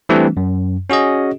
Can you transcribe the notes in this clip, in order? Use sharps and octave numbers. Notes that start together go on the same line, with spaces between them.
E3 G3 A3 C4 D4
F#2
C#4 F#4 G#4 D#5